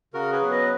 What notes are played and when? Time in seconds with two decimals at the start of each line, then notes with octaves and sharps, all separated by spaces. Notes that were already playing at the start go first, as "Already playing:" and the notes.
0.13 C#3 F#4 A#4
0.32 G#4 B4
0.42 F#3 B3
0.51 B4 D#5